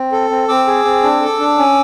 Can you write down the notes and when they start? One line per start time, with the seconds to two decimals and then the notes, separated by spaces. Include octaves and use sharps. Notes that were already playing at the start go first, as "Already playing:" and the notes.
Already playing: C4
0.12 A4
0.30 C4
0.49 C4 D6 E6
0.67 G#4
0.85 C4
1.03 D4
1.21 A4
1.40 D4
1.58 C#4